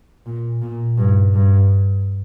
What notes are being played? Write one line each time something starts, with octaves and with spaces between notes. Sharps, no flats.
A#2
A#2
G2
G2